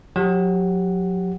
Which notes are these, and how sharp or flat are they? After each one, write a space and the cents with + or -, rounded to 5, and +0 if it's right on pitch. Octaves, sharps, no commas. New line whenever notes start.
F#3 -35 G4 +0 F#5 +0